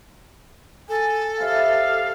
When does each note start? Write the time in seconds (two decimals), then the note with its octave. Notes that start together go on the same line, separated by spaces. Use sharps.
0.89 A4 G#5
1.40 G4 C5 E5 F5 B5